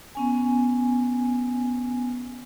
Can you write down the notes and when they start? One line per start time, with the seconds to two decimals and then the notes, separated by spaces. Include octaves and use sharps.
0.15 B3 C#4 G#5